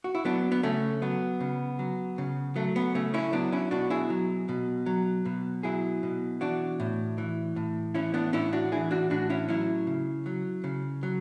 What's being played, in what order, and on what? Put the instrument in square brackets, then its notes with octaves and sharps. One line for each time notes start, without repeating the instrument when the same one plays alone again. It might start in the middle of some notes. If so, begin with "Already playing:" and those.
[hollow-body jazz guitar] F#4
E4
F#3 B3 D4
B3
C#3 A3 C#4
F#3 B3
C#3
F#3
C#3
F#3 A3
B3
C#3 A3 C#4
C#4 E4
F#3 B3 D4
C#4 E4
B2 D4 F#4
E4 G#4
F#3
B2
F#3
B2
F#3 E4 G#4
B2
E3 D4 F#4
A2
E3
A2
E3 C#4 E4
B3 D4
A2 C#4 E4
D4 F#4
E3 E4 G#4
D4 F#4
A2 D4 F#4
C#4 E4
F#3 C#4 E4
C#3
F#3
C#3
F#3